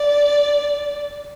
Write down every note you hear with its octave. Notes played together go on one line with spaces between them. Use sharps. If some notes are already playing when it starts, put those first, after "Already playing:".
Already playing: D5